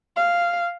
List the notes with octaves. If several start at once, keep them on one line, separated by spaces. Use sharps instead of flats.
F5